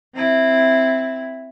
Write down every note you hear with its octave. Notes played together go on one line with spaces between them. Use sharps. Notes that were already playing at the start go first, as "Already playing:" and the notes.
C4 E4